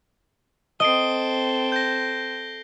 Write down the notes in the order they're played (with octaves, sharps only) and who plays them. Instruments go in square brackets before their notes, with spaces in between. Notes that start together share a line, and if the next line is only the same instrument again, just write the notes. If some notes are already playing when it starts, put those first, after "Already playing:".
[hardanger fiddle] C4 A4 [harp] D#5 [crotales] C7 D7 G7
[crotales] G6 A#6